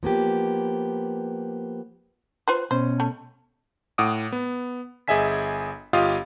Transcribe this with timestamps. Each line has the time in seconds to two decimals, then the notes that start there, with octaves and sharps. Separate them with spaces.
0.03 F3 A#3 B3 G4
2.48 F4 B4 C5
2.71 B2 C#4 C5
3.00 A3
3.98 A2 F#5 D6 D#6 D7
4.32 B3
5.08 G1 G#4 D#5 E5 G#5 B6
5.93 G1 F4 G4 D#5 F5 D#6